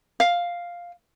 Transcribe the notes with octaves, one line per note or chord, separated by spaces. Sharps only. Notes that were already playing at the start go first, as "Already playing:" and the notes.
F5